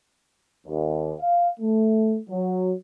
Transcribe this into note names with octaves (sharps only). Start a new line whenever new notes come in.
D#2
F5
A3
F#3